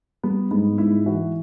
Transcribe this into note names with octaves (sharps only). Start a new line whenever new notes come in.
G3 B3
G#2 B3
G#2 E4
E3 F#4